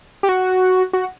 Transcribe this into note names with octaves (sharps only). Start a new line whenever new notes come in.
G4
F#4
F#4